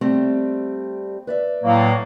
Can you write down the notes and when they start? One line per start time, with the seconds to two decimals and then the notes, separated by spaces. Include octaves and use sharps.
0.01 G3 A3 C4
1.27 B4 D5 E5
1.64 A2 F#3 A#3